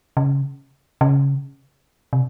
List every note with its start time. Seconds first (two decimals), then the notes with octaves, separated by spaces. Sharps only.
0.17 C#3
1.01 C#3
2.13 C3